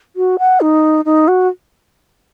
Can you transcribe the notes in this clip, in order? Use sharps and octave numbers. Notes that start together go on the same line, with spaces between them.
F#4
F#5
D#4
D#4
F#4